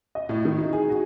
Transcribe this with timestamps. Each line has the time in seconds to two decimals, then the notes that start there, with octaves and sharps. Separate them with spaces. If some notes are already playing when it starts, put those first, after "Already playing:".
0.15 D#5
0.29 A2
0.45 D#3
0.58 D#4
0.73 G#4
0.89 F#4